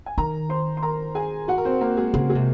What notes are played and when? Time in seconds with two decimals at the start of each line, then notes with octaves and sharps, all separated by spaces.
0.06 G#5
0.18 D#3 A#4 A#5
0.49 C5 C6
0.77 C6
0.83 A#4 A#5
1.15 G#4 G#5
1.48 F#4 F#5
1.58 A#4
1.65 C4 C5
1.81 A#3 A#4
1.97 G#3 G#4
2.14 C#3 G#3 G#4
2.30 G#3 G#4
2.35 C3